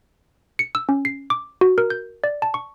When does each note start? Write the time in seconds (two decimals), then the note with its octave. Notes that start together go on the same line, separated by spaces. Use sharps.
0.59 C#7
0.75 E6
0.89 C#4
1.05 C7
1.30 D6
1.61 F#4
1.78 A#4
1.90 G6
2.24 D5
2.42 A5
2.54 C#6